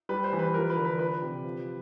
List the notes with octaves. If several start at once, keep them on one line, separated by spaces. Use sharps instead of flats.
G3 B4
C5
E3
B4
F3 A#4
B4
D3
B4
F3 B4
C3
F3